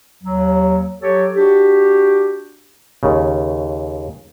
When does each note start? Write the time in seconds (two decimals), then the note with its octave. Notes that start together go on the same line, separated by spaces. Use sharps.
0.23 D#2 F#3
1.01 F#3 G4 A4 C#5
1.35 D4 F#4 G4
3.03 D#2 C#3